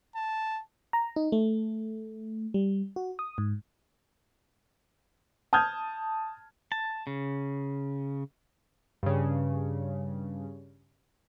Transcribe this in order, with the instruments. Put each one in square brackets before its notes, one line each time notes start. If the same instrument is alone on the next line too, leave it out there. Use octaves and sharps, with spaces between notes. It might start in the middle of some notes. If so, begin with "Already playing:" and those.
[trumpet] A5
[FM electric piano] A#5
D#4
A3
G3
F#4
D#6
G#2
[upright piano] A5 D#6 F6 G6 G#6
[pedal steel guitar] A5
C#3
[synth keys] G2 C#3